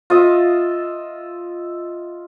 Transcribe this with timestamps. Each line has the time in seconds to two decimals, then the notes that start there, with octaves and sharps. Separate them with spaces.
0.10 F4 D#5 E5